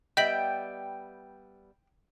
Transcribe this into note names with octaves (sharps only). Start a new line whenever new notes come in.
G3 B3 D#5 E5 G5 B6 F#7